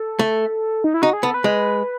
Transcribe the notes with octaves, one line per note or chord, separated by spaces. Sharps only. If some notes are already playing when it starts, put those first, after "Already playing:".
Already playing: A4
A3
D#4
E4
D#4 F#4
G#4
B3 A4
B4
G#3